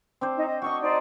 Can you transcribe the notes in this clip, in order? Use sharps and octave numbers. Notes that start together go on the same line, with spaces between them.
C4 D4 C5
D#4
D#5
F#4 A4 D#5 C#6
D#4 C5 D5